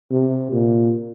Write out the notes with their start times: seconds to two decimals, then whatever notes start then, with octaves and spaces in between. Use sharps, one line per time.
0.11 C3
0.52 A#2